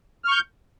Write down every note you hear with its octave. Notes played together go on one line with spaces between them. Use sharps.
C#6 F6 G6